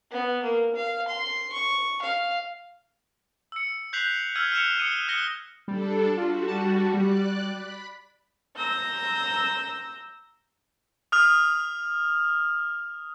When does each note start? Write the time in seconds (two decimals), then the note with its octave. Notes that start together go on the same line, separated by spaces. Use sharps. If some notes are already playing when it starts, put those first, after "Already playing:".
0.11 B3
0.43 A#3
0.76 F5
1.08 C6
1.52 C#6
2.02 F5
3.52 E6 C#7
3.93 F#6 G6 B6 C7 F7 F#7
4.35 E6 F6 G#6 D#7
4.52 F6 F#6 C#7 E7 F7
4.78 D#6 F6 C#7 D#7 F7 G7
5.08 D#6 F6 F#6 A#6 C#7 G7
5.68 G3 D4 A4
6.17 G3 F4 F#4
6.48 A5
6.94 G3 D5 F#6
7.54 B5
8.58 A#5 E6 G6 A#6
11.12 D#6 F6 F7